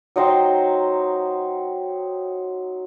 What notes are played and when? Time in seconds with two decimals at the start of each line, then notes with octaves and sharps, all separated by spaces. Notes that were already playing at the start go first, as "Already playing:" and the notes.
0.16 F#3 D#4 C5 G5